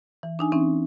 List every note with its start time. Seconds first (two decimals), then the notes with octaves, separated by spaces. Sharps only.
0.23 E3
0.39 D4 D#4 G#5
0.52 E3 C4 C#4 D#4